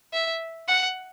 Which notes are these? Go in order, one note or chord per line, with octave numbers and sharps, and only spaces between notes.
E5
F#5